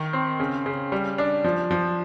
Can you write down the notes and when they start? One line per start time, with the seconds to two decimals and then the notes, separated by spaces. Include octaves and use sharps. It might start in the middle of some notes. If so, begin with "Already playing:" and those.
Already playing: D#3
0.13 C4
0.40 C#3
0.66 C#3
0.92 G3
1.18 D4
1.44 F3
1.71 F3